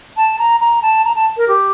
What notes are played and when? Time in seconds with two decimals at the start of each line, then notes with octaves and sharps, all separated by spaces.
0.17 A5
0.38 A#5
0.60 A#5
0.82 A5
1.05 A#5
1.15 A5
1.37 A#4
1.48 G4